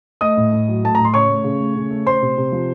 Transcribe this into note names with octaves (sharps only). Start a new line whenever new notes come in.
A3 D#5 D#6
A2
A2
F#3
A3 A5
A2 A#5
C6
C#3 C#5 C#6
A3
C#3
A3
C#3
A3
A3 C5 C6
C3
C3
F3